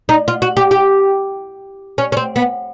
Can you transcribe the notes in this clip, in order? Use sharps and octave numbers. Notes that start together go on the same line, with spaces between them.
D#4
F4
F#4
G4
G4
C#4
C#4
C4
B3